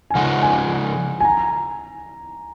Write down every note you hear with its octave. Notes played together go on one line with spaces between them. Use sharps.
G#5
C#3 F3 G#3 D#4 F#5
G#5
G#5
A#5